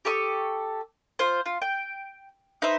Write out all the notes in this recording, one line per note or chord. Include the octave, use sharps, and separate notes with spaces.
G4 A4 C#6 D#6
F4 C5
F4
G5
D#4 B4 C5 E5